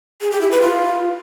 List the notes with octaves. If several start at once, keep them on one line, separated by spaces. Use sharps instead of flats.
G#4
G4
E4
B4
F4